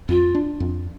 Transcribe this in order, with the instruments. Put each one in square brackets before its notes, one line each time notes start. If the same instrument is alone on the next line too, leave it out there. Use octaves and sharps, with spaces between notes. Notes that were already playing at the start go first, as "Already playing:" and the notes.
[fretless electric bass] F2 [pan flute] F4
[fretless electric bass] D4
F2